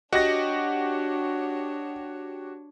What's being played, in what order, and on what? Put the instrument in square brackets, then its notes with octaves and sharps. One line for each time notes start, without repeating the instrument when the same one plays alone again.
[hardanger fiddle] D4 C#5 [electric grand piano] F#4 G4 F#5 [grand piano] D#5 A#6